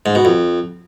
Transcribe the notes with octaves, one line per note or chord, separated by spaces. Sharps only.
G#2
B2
F2